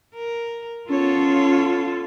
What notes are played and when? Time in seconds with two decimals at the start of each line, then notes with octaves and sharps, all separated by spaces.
0.15 A#4
0.90 B3 C#4 F4 A4 C#5